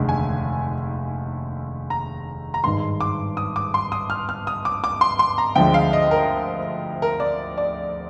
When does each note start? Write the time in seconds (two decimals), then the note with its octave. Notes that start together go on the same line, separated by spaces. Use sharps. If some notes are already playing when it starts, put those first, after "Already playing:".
Already playing: F1 D#2 D3 G#3
0.09 G#5
1.90 A#5
2.54 A#5
2.63 G#1 G2 D#3 G#3 C6
3.01 D6
3.37 D#6
3.56 D6
3.74 C6
3.92 D#6
4.10 F6
4.29 F6
4.47 D#6
4.65 D6
4.84 D6
5.01 C6
5.19 C6
5.38 A#5
5.55 D2 D3 F3 G#3 G5
5.74 F5
5.93 D#5
6.11 A#4
7.02 A#4
7.20 D5
7.58 D5